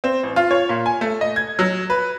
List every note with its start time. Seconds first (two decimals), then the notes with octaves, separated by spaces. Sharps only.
0.04 C4
0.23 A1
0.36 F4
0.51 C#5
0.69 A#2
0.86 G#5
1.01 A3
1.21 D#5
1.36 G#6
1.59 F#3
1.90 B4